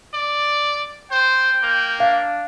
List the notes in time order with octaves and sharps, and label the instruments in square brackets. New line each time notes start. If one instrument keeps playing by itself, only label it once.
[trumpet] D5
[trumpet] C5 [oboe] G5
[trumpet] A#3
[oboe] D4 [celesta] F5